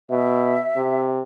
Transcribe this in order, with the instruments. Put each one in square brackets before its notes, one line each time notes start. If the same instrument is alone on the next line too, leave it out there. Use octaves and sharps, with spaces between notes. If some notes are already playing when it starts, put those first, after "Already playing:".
[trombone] B2 [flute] E5
[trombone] C3